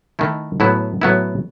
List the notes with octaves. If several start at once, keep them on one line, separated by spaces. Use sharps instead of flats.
D#3 A3 E4
A2 F#3 B3 E4
A2 F#3 B3 E4